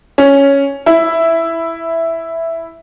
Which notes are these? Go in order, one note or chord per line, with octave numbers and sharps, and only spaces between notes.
C#4
E4